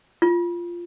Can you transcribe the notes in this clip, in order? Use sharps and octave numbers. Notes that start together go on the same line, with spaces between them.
F4